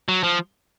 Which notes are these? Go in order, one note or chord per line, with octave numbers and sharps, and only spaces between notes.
F#3
F3